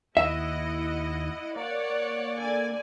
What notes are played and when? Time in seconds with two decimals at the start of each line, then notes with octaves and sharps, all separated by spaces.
0.17 D#2 E4 D#5 E5 F#5
1.56 A#3 C#5 D5 F#5
2.37 D3 D5 G#5